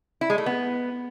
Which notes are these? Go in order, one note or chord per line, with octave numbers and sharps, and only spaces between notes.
E4
G#3
A3
B3